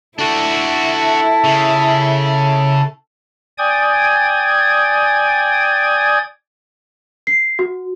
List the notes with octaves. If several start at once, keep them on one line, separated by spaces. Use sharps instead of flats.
D4 E4 F#4 A4 A5
C#3
D5 G5 G#5 D#6 G#6
C7
F#4